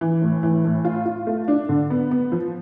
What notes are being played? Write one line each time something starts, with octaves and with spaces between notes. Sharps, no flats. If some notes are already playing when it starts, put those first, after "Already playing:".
E3
A2
E3
A2
F4
F4
A3
D4
D3
B3
B3
F3